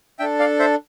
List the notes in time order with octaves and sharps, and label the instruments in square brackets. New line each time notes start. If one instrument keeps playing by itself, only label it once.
[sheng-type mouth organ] D4 A4 E5 G5
D5 F5
C5 E5